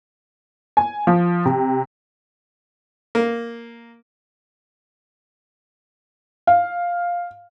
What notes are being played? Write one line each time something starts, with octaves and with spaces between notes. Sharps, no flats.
G#5
F3
C3
A#3
F5